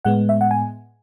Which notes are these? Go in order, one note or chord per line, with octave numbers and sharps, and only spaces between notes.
A2 G#3 B3 F#5
E5
F#5
G#5